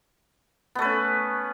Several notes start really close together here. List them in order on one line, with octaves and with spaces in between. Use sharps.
B3 A3 B4 C#4